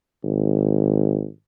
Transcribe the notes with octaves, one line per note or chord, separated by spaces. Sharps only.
G#1